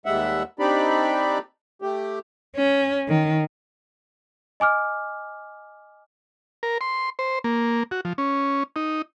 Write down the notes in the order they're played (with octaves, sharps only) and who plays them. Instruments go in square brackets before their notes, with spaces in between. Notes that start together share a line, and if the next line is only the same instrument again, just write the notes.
[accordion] D#2 G3 G#3 E5 F#5
C4 D4 D#4 G4 D5 B5
A3 G4
[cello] C#4
D#3
[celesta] D#5 G#5 D6 F6
[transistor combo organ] A#4
C6
C5
A#3
F#4
F3
C#4
D#4